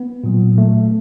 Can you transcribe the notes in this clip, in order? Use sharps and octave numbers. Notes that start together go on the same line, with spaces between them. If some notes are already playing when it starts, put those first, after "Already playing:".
Already playing: B3
A#2 F#3
A3